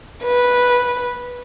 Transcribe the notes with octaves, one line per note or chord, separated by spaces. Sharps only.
B4